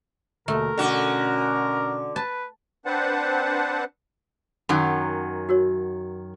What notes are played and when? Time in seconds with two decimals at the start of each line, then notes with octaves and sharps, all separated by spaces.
0.48 D#2 B2 D3 A3 A#4
0.78 B2 D3 C#4 F#4
2.16 B4 A5
2.86 C4 D4 B4 C5 F#5 A5
4.69 F#2 D#3 F#3
5.49 F#4 A#4 C#5